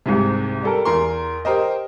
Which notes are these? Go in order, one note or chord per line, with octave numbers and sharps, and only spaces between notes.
C2 G#2 C3
G3 A4 A#4
E2 A#4 C6
G4 A#4 C5 D#5